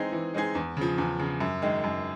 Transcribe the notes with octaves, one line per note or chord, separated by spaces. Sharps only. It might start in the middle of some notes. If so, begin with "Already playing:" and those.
Already playing: E3 G#3 C4 D#4 G#4
E3
G#3 C4 D#4 G#4
E2
C#3 F3
E2
C#3 F3
F#2
D#3 G#3
F#2